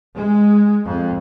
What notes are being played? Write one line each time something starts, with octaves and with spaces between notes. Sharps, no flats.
G#3
F2